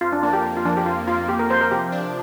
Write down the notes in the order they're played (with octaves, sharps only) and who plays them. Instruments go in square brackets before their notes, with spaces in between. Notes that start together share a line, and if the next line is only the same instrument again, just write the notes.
[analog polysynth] F2 [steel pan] F4
[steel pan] D4
[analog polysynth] A#3 [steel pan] D4
[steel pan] G4
[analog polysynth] F2
[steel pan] F4
[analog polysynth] F3 [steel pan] D4
[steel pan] G4
[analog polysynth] F2 [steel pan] F4
[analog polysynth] A#3 [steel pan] F4
[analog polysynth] F2 [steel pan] G4
[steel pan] A#4
[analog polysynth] F3 [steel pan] C5
[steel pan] A#4
[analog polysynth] C3 [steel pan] G4
[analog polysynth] D4